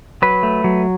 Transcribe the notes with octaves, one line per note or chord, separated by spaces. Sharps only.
F#3 B4
A3
F#3